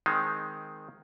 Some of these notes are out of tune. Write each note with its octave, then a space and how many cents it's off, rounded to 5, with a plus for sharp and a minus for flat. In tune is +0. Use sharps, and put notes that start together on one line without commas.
D#3 +0 G#3 +10 C4 +0